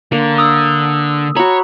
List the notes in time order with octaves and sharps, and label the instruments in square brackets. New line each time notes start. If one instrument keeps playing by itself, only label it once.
[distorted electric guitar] D3 [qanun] A#3
[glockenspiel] D#6 E6
[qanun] F#4 B5 [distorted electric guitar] C#5 [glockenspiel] A#5